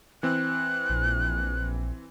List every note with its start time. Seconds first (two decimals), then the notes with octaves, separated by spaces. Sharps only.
0.23 E3 C4 F#6
0.90 A#1